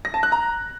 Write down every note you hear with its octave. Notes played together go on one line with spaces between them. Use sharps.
A#6
A5
F#6
A#5